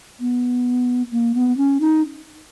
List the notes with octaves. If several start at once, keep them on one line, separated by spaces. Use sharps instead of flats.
B3
A#3
B3
C#4
D#4